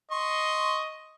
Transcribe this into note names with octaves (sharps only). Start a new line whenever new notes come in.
D#5 C6 C#6